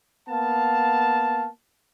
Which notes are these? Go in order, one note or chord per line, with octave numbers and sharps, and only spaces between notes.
A#3 B3 F5 A5